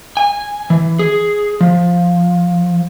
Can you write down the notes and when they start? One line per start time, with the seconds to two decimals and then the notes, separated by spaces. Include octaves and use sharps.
0.17 G#5
0.70 E3
0.99 G#4
1.61 F3